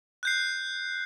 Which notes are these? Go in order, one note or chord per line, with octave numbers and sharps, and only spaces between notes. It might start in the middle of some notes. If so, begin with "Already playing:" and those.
F#6 G6 C7